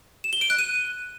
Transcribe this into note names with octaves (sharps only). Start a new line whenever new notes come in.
E7
G7
D7
F#6
D#7